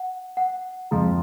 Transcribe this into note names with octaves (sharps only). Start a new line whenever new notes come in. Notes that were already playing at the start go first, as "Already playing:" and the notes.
Already playing: F#5
F#5
F2 F3 G#3 A#5